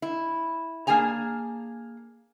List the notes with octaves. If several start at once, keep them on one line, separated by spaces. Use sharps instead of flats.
E4
A#3 D4 G#4 G#5 A#5